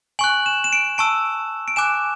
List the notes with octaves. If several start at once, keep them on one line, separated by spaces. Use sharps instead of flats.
G#5 C#6 F#6 F#7
E7
E7
D7
A5 C#6 E6 D7
D7
G#5 D6 F#6 E7